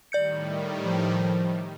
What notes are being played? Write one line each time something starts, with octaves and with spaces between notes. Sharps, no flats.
A2 D#3 G3 D5 G6 C#7
F3